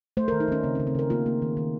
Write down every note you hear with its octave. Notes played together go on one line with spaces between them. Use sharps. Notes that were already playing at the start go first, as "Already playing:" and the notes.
A3 C5
A#4
D#3
D#4
D#3 C#4
C#3 C4
C#4
C#3
C4
C#3 A#4
A#3 F4
A#3
D#3
D#3